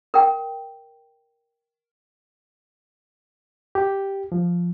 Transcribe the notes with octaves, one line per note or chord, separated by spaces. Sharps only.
A#4 G5
G4
F3